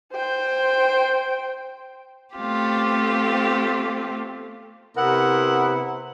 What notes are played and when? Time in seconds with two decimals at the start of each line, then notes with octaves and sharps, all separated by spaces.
0.13 C5 G5
2.35 A3 B3 C4 F4 G4
4.96 C3 B3 E4 A#4 F#5